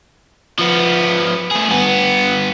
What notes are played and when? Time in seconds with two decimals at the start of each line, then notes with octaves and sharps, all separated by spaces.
0.59 F3 B3
1.51 A3 G#4
1.70 G2 B3